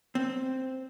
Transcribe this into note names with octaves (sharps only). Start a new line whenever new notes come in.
C4